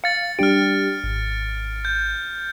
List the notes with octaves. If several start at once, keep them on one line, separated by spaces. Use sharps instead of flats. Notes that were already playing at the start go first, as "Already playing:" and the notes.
F5 A6 C#7
G3 D4 G4 F6 D7
G#1
G6